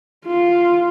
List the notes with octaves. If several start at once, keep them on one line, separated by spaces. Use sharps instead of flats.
F4